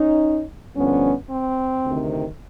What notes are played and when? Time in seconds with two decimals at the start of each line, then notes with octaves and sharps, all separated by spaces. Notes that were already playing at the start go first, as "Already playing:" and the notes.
Already playing: C#4 D#4
0.75 G2 D3 F3 B3 C#4
1.30 C4
1.86 D2 C3 D#3